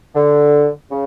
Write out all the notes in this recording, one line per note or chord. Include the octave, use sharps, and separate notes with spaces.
D3
C#3